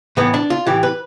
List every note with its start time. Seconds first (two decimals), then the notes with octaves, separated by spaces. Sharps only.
0.17 A2 E3 B3
0.34 D4
0.50 F4
0.66 A2 E3 G4
0.83 B4